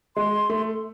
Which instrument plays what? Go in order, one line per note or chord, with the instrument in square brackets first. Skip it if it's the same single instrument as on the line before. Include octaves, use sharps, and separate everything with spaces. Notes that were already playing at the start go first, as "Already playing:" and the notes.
[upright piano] G#3 [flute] C6
[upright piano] A3